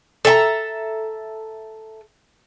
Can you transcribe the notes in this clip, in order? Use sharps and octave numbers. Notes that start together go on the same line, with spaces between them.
A4 E5 A5 A#5